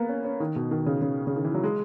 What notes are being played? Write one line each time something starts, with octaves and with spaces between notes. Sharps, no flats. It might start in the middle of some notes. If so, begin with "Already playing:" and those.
Already playing: A#3 B3
C#4
C#4
D#3
B2
D#3
C#3
C#3
C#3
D#3
E3
F#3
G#3